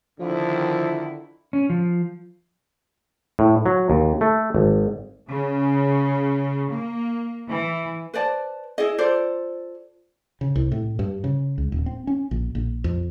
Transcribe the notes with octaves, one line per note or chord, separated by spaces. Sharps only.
D3 D#3 F3 E4
C#4
F3
A2
F#3
D#2
A3
G#1
C#3
A#3
E3
B4 C5 D5 A5
E4 G#4 D#5
F4 A4 C5 D5
C#3
C2
A2
G2
C#3
C#2
D#1
C4
C#4
A#1
A#1
F2